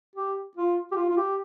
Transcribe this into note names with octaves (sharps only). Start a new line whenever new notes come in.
G4
F4
G4
F4
F4
G4